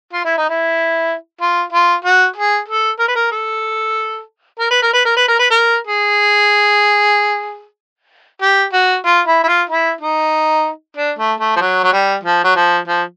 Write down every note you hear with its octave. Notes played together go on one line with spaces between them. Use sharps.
F4
E4
D#4
E4
F4
F4
F#4
G#4
A4
A#4
B4
A#4
A4
A#4
B4
A#4
B4
A#4
B4
A#4
B4
A#4
G#4
G4
F#4
F4
E4
E4
F4
E4
D#4
D4
A3
A3
F3
F#3
F#3
G3
F3
F#3
F3
F3